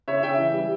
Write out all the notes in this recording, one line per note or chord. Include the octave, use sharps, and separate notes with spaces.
C#3 C#5 E5
C#3 E5 G5
E3
G3